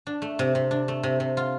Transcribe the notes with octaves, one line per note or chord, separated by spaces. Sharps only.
D4
A3
C3
C3
D4
A3
C3
C3
F4